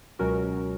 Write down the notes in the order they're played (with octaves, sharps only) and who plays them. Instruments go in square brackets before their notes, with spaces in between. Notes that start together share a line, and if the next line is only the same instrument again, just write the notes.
[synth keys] C#2 B2 F#3 C#4 F#4 A#4